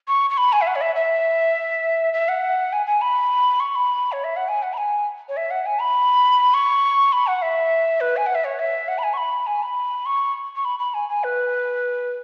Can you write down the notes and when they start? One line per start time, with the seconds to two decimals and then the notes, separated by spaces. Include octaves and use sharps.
0.08 C#6
0.30 C#6
0.37 B5
0.53 G#5
0.61 E5
0.67 F#5
0.75 C#5
0.81 E5
0.95 E5
2.13 E5
2.28 F#5
2.73 G#5
2.86 G#5
3.01 B5
3.60 C#6
3.75 B5
4.12 C#5
4.24 E5
4.36 F#5
4.48 G#5
4.62 F#5
4.73 B5
4.77 G#5
5.29 C#5
5.37 E5
5.51 F#5
5.66 G#5
5.81 B5
6.54 C#6
7.12 B5
7.27 F#5
7.42 E5
8.00 B4
8.17 G#5
8.26 F#5
8.35 E5
8.44 C#5
8.59 E5
8.88 F#5
8.98 B5
9.03 G#5
9.13 C#6
9.17 B5
9.47 G#5
9.63 B5
10.06 C#6
10.56 C#6
10.65 B5
10.79 B5
10.94 G#5
11.09 G#5
11.24 B4